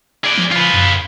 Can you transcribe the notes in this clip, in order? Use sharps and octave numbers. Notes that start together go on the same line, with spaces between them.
G#4 D5
F3
F4 B4
F#2